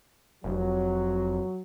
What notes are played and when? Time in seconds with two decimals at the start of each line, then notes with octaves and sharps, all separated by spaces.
0.44 F1 F#3